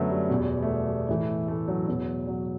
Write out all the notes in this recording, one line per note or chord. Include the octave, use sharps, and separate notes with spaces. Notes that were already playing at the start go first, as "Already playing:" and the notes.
Already playing: F#2 D3 F#3 A3 B3
G3
E2 B2
A3
G3
G3
A2 E3 A3
A3
F#3
E2 B2 F#3
F#3